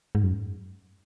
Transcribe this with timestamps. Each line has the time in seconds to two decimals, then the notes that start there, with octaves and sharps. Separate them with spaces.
0.15 G#2
0.23 F#2